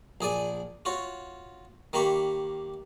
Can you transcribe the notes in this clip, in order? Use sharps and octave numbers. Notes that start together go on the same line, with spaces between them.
A#1 G#4 D5 G#5
F4 F#4 C#5
D#3 A#3 G4 B5 C#6